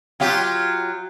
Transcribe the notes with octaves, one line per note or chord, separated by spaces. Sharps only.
F#3 F4 G4